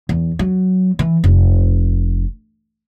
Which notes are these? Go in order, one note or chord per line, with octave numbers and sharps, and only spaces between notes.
E2
F#3
E3
F1